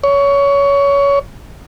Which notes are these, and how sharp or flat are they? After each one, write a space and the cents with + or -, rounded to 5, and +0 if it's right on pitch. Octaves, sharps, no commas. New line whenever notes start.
C#5 +20